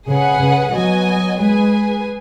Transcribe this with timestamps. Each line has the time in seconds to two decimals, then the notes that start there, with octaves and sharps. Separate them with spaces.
0.08 C#3 G#4 B4 F#5
0.41 C#3
0.74 F#3 B3 F#4 D#5 G#5
1.39 G#3 G#4 B4 G#5